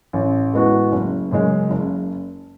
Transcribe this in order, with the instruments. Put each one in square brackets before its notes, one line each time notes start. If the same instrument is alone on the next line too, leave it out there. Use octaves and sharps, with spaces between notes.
[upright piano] A1
A2 G#3 B3 F#4
F#1
F#2 C#3 G#3
F#1